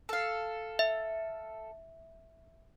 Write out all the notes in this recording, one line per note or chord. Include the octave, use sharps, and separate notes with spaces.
A4 F5
E5